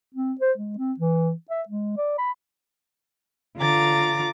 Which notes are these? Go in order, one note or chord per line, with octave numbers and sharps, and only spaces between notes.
C4
C5
G#3
C4
E3
E5
G#3
D5
B5
D3 F4 A#5 D6 A6